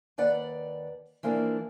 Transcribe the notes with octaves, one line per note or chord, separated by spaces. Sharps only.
D#2 B4 D5 F#5
E3 F3 A#3 D4 A#4